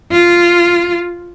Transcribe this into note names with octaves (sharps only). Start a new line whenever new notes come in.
F4